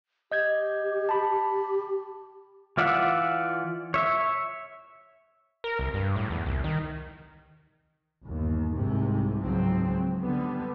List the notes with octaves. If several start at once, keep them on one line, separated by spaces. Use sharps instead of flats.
G4 D#5 G6 G#6
A5 B5
G4
E3 F4 D5 E5 F#5
C#5 E5
A#4
C2
G2
A2
E2
C2
D#3
G1 D#2
C2 G#2 C3
C#2 G#2 F3 F#3 C4
D3 G3 B3